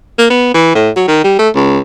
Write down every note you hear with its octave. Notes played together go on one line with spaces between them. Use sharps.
A#3
B3
E3
A2
F#3
D#3
G3
A3
C#2